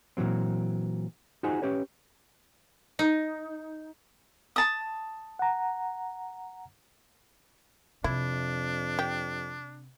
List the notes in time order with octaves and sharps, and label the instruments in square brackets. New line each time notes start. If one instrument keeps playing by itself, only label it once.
[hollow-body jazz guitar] A#2 E3 F#3 C4
D#4 F4 F#4 G#4 C5 G#5
C#4 G4 B4 C#5
[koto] D#4
[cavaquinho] A5 D#6
[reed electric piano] F#5 A#5
[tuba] F2 [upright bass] C3 [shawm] D4 [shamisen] E4
[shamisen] G4